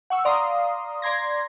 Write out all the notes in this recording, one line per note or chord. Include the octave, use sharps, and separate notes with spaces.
F#5 C#6 E6
D5 F5 A#5 C6 D#6
D5 A#5 C6 G#6 A#6